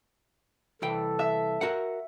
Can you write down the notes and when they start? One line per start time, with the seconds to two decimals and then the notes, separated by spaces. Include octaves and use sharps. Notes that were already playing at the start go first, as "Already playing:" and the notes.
0.82 C2 E3 A4 G5
1.19 E5
1.61 F#4 A#4 F#5